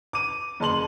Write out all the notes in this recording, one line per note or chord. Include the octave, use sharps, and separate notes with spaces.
D6 D#7
F#1 A5 C6 F#7